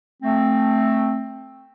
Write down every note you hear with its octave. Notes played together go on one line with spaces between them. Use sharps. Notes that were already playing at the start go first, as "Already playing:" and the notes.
A3 C4